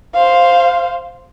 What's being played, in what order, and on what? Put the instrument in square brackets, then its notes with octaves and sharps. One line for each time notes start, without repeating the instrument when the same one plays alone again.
[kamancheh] C5 F5